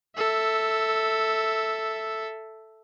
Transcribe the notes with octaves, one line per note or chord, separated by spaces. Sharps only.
A4 E5